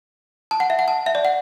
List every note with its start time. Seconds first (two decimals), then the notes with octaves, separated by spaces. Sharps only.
0.51 A5
0.60 F#5
0.70 E5
0.79 F#5
0.88 A5
1.06 E5
1.15 D5
1.25 F#5